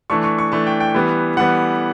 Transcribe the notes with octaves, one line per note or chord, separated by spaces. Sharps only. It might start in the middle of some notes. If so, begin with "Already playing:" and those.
E3 A3 D4 C#6
C#6
C#6
E3 A3 D4 A5
G5
G5
E3 G3 B3
E3 G3 B3 F#5